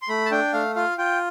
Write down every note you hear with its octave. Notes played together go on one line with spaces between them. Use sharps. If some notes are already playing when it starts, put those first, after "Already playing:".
C6
A3 B5
A5
D4 G5
A3 F5
F4 F5
F4 G5